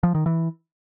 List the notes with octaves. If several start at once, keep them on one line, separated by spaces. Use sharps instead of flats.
F3
D#3
E3